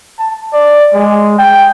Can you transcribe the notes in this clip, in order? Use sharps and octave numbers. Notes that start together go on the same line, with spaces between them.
A5
D5
G#3
G5